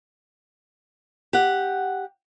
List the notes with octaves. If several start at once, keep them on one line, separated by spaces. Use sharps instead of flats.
G4 F#5